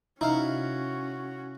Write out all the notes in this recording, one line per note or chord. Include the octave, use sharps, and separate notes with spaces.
C3 C#4 D#4 E4 F#4 F5